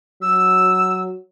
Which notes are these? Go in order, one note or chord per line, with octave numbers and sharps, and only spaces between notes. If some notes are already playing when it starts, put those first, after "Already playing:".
F#3 E6